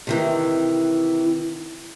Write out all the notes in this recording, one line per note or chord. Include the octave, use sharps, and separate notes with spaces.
C3 D#3 E3